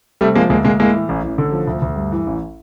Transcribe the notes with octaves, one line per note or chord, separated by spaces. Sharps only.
C3 G3 A3
F3 G#3 A#3
D2 G#3 A#3
D2 G#3 A#3
A2 G#3 A#3
E3
A1
A1
D3
F3
D2
D2
G2
E3
A1